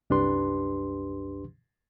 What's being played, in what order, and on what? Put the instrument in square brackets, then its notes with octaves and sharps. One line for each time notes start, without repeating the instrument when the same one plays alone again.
[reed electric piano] C2 F#2 D4 G4 B4 C6